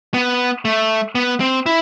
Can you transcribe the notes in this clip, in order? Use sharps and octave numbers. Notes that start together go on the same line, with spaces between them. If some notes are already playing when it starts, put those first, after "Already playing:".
B3
A3
B3
C4
E4